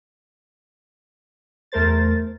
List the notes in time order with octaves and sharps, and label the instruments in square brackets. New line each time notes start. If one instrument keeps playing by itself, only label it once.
[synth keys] E2 A3 A#4 C5 A6